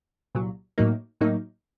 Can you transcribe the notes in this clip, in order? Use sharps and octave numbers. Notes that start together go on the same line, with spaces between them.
C2 A#2 F#3
A2 F#3 A#3 D#4
A2 F#3 A#3 D#4